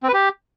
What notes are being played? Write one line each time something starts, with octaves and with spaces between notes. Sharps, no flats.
C4
B4
G4